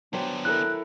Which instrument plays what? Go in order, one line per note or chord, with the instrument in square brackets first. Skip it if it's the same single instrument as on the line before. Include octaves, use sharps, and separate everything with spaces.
[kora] F#3 G4 C5 [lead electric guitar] B3 D4
[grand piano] E4 A4 A#4 [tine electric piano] F#6